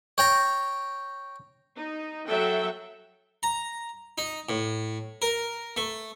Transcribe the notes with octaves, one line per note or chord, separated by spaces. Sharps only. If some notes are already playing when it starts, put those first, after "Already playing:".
C#5 G5 A#5
D#4
F#3 A4 E5 F#5 G5
A#5
D#4
A2
A#4
A3